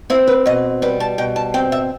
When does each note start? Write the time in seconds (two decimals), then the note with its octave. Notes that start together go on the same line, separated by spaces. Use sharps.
0.10 C4 E4
0.27 B4
0.46 B2 D#5
0.82 G3 B4
1.00 A5
1.18 B2 G5
1.36 A5
1.54 C4 G5
1.72 E5